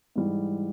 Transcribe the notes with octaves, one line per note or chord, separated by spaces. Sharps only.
G#2 E3 G3